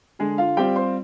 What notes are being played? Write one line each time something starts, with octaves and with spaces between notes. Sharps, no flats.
D3 G#3 G#4
F4 F5
G3 C4 F4 G4 G5
C5 C6